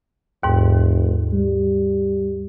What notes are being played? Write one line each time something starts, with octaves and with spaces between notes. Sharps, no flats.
F1 D#2 G#2
G3